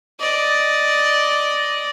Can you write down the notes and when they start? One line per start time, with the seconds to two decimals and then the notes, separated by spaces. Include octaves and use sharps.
0.20 D5 D#5